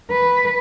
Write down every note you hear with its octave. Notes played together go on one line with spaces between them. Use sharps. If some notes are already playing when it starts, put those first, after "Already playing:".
B4